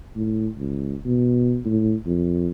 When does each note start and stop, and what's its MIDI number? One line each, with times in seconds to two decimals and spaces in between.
0.16 0.48 45
0.58 0.95 37
1.05 1.60 47
1.65 1.94 45
2.06 2.50 41